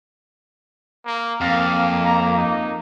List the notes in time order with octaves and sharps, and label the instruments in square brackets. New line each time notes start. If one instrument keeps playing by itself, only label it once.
[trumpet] A#3
[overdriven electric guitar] F2 [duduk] A#3 [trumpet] F5
[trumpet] A#5
D#4